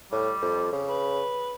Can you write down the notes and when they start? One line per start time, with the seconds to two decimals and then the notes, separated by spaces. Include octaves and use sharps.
0.12 A2 G3
0.42 F2
0.72 C#3
0.88 B4